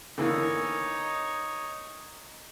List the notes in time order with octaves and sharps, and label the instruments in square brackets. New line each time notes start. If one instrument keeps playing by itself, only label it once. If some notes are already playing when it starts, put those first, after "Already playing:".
[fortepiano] D3 E3 A#3 [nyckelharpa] D#4 C#5